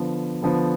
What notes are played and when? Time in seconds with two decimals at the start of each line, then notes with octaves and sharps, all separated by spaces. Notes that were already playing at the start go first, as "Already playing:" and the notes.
Already playing: D3 F3 B3
0.42 D3 F3 B3